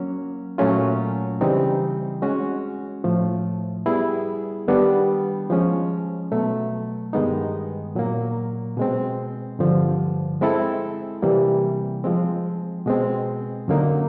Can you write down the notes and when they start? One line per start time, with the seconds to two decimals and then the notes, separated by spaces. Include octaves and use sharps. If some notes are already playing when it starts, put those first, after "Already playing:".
Already playing: F#3 A#3 C#4
0.58 A#2 F#3 A3 C#4 F4
1.41 C#3 E3 G3 C4 D#4
2.22 G#3 C#4 F#4
3.04 A2 F3 A3
3.86 G3 B3 E4 G#4
4.68 D#3 G3 B3 D4
5.50 F3 G#3 C#4
6.32 B2 F#3 A3
7.13 G2 D#3 G#3 B3 D#4
7.95 A#2 F#3 A#3
8.77 B2 G#3 C4
9.59 G2 D3 F3
10.41 G#3 C4 E4 A4
11.22 C3 E3 G3 A#3
12.04 F3 G#3 C4
12.86 B2 G#3 C4
13.68 F#2 D3 F#3 A#3 D#4